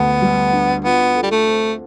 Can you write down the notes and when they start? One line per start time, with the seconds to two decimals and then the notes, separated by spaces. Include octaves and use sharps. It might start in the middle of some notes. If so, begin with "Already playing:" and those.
Already playing: D2 D3 B3
0.22 G3
0.53 D4
0.84 B3 F4
1.15 A4
1.23 G3
1.31 A3
1.47 C4